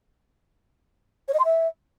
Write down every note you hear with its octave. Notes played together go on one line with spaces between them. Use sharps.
C#5
D#5
C6
E5